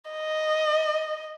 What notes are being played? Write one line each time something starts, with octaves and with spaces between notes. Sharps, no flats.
D#5